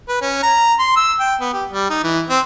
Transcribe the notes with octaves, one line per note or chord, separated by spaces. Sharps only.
B4
C#4
A#5
C6
E6
G5
B3
G4
G3
D#4
E3
C4